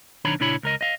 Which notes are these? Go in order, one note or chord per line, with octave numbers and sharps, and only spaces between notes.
B1 D#3 D4 C#5 A#5 B5
A#2 C#3 D4 E4 C#5 B5
C#2 A#4 D#5
D#5 F5